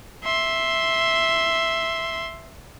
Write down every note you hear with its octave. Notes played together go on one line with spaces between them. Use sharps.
E5 C6